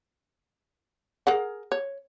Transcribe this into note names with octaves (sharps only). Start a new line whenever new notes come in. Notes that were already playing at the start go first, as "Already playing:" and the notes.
G#4 A#4 F#5
C#5